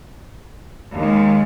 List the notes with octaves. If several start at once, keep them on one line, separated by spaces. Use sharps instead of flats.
D#2 D#3 G#3